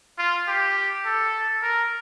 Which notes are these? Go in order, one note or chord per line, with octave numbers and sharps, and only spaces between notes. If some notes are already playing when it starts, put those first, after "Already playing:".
F4
G4
A4
A#4